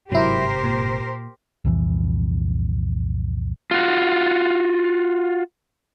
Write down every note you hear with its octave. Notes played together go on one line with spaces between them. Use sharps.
G1 G#2 C3 F#3 E4 G4 A#4 C5
A#2
C2 F2 A#2 E3
F4 F#4